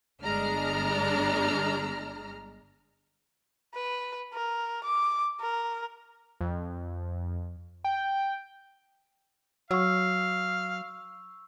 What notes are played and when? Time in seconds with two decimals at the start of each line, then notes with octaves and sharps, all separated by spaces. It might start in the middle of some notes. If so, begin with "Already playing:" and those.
0.22 G1 G#3 D4 A#5 F6
3.75 B4
4.33 A#4
4.84 D6
5.41 A#4
6.41 F2
7.84 G5
9.71 F#3 F5 C#6 E6